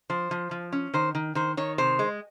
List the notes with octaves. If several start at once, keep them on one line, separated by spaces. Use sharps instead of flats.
F3 C5
F3
F3
C#4
D#3 C5
D#3
D#3 C5
D#3 C#5
C3 C5
G#3